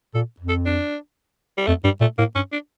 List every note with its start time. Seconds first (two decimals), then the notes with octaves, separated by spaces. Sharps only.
0.15 A#2 A4
0.40 F2
0.49 A4
0.66 D4
1.57 G3
1.67 F2 A3
1.84 G2 G3
2.01 A#2 A3
2.18 A2 A#3
2.35 G2 C#4
2.52 D4